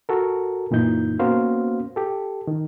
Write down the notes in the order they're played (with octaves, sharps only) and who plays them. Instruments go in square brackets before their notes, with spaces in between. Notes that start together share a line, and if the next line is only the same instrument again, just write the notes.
[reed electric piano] F#4 A4 A#4
F#2 A#2 E3 D#4 G6
A#3 B3 C#4 F#4 C5 F5
G4 A4
D#3